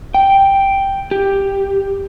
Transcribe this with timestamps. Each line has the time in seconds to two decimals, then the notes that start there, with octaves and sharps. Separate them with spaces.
0.14 G5
1.11 G4